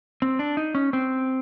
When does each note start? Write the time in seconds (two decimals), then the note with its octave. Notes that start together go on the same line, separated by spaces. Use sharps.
0.22 C4
0.39 D4
0.57 D#4
0.75 C#4
0.93 C4